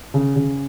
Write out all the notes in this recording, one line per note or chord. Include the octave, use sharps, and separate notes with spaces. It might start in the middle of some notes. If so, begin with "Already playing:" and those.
C#3
C#3